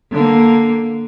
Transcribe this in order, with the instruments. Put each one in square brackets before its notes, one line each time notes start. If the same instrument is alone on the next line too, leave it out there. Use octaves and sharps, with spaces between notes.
[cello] D3 A#3